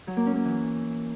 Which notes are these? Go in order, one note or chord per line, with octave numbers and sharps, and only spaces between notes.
F#3
A#3
C#4
A#3
E3